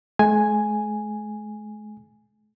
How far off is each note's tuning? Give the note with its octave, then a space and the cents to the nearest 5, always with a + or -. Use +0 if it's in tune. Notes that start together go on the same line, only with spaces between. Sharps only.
G#3 +45 G#5 +0